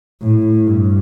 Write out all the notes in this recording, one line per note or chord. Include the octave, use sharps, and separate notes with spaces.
A2
G2